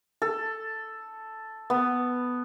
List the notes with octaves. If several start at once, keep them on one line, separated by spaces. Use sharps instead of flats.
A4
B3